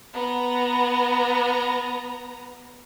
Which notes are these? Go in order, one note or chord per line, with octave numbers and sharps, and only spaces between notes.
B3 A#5